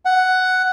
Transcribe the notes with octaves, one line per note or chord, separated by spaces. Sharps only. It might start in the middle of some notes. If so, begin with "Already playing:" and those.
F#5